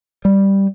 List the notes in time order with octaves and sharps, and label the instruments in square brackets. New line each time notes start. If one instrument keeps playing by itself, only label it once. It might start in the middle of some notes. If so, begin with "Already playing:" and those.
[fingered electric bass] G3